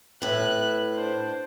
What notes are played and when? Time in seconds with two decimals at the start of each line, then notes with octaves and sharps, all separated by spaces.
0.22 A2 B4 E5 F#6
0.94 D4 C5